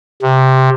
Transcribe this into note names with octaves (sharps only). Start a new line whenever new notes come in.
C3